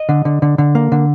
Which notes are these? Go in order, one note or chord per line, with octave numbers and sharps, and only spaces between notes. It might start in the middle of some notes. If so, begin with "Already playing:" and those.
Already playing: D#5
D3
D3
D3
D3
A#3
D3